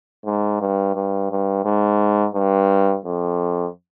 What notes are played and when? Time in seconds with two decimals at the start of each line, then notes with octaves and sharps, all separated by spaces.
0.25 G#2
0.61 G2
0.95 G2
1.31 G2
1.65 G#2
2.35 G2
3.05 F2